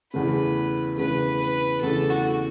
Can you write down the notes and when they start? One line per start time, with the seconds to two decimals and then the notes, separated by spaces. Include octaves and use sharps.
0.13 E2 C#3 A3 B4
0.97 E2 C#3 A3 B4
1.40 B4
1.81 E2 C#3 A3 A4
2.10 F#4